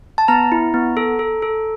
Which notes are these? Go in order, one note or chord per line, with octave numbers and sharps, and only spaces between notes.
A5
B3 A#5
E4
B3
A4
A4
A4